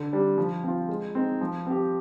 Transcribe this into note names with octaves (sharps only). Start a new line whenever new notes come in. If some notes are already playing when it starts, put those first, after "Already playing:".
Already playing: D3
G3 D4
F3
C4 F4
G#3
C4 D#4
F3
C4 G4